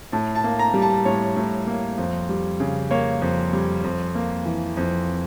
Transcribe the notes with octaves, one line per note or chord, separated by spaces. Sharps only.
A2 A5
A5
A#3
A#5
G3
A5
A2 C#5
A2
A#3
F2
G3
C#3
A#3 C#5
F2
G3
F2
A#3
E3
F2